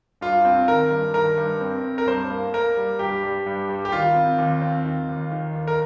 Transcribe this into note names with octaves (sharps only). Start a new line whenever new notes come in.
G2 F4
C4
D#3 A#4
G2
D#3 A#4
G2
C4
C4
A#4
G2 C5
A#3
A#3 A#4
G3
G2 G4
G3
G2
G3
G4
D#3 F4
C4
D#2
C4
D#3
D#2
D#3
D#2
A#4